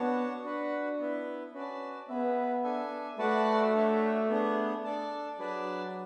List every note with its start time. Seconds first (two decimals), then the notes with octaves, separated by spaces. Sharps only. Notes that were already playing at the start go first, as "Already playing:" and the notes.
Already playing: B3 D4 F#4 C#5 F#5 A5
0.44 D4 F#4 B4 F#5
0.99 B3 E4 B4
1.54 C#4 F#4 B4 D5 A5
2.08 B3 G#4 B4 E5
2.64 D4 A4 E5 G#5
3.18 A3 F#4 B4 D5 F#5 A5
3.73 D4 F#4 C#5 E5
4.29 B3 D4 G#4
4.84 D4 A4 D5 A5
5.38 F#3 D4 G#4 B4 D5 A5